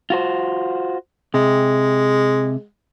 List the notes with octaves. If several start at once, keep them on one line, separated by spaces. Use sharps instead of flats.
F4 F#4 C5
C3 G#3